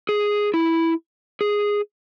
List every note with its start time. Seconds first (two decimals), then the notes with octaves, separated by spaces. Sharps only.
0.09 G#4
0.54 E4
1.41 G#4